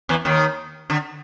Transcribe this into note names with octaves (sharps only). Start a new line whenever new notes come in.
E2 E3
D#2 D#3
D3